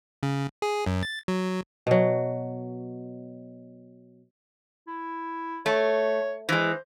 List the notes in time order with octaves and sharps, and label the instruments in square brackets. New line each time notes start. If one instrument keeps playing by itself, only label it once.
[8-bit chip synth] C#3
G#4
F#2
A6
F#3
[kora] B2 F#3
[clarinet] E4
[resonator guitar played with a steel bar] A3 [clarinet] C#5
[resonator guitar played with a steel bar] E3 G#3 [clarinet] C5